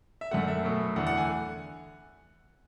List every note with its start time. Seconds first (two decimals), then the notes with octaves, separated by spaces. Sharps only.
0.21 E5
0.31 F#2 D3 A3 F#5
0.48 E5
0.64 B2 F#3 A3
0.96 E2 D3 A3 F#5
1.07 F#5
1.17 G#5